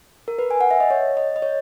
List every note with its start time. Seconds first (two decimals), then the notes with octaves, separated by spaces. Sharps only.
0.28 A#4
0.39 B4
0.51 G#5
0.61 F#5
0.71 E5
0.80 D#5
0.90 C#5
1.17 D#5
1.36 D#5
1.42 C#5